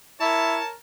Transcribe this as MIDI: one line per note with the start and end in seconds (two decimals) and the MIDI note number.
0.21 0.59 64
0.21 0.71 70
0.21 0.71 73
0.21 0.71 81